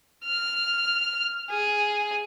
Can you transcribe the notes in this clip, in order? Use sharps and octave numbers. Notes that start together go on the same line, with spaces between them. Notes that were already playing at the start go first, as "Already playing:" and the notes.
F6
G#4